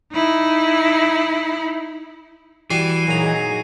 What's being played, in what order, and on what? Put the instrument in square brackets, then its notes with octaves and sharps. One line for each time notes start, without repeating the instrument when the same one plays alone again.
[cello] D#4 E4
[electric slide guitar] E3 [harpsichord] G3 F#4 D5 [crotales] C7 D#7
[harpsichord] A#2 A#5 [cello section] F#3 D#4 G#4